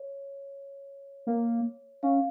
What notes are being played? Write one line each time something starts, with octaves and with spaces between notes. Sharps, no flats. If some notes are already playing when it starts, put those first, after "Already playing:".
Already playing: C#5
A#3
C#4 F5